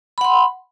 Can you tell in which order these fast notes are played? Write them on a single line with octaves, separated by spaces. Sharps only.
B5 F#5 C6